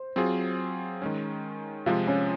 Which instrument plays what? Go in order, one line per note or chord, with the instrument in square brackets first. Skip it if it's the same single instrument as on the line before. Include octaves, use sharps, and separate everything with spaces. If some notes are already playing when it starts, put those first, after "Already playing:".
Already playing: [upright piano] C5
[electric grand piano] F#3 C4 F4 G#4
D#3 G#3 C#4
[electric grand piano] C3 F3 G#3 [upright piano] F4
[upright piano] C#4